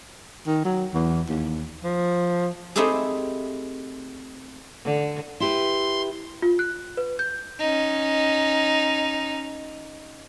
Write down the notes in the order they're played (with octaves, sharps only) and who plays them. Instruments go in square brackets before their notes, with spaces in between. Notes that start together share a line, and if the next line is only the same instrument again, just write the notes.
[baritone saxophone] D#3
F#3
E2
D#2
F3
[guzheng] A3 C4 D#4 E4 G4 G#4
[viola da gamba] D3
[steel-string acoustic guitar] E4 G4 B4 [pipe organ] C6
[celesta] F4
F#6
B4
G6
[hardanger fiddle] C#4 D#4